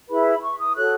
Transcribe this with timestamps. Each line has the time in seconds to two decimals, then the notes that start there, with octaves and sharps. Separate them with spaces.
0.10 E4 G#4 B4 B5
0.26 B5
0.42 C#6
0.59 D#6
0.75 F#4 A4 C#5 F#6